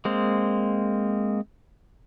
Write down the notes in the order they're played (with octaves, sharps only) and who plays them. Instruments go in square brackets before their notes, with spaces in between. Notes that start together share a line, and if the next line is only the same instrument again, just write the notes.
[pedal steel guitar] G#3 A#3 C4